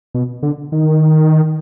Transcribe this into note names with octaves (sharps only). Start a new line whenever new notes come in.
B2
D3
D#3